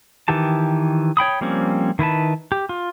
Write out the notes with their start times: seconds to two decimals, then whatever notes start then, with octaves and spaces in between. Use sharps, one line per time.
0.28 D#3 E3 G4 A5
1.17 C#5 G5 B5 D#6
1.41 F3 G3 A#3 C4 C#4
1.99 D#3 E4 B4 A5
2.52 G4
2.69 F4